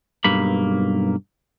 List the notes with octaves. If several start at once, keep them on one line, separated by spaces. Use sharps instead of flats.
B1 G2 A#3 B5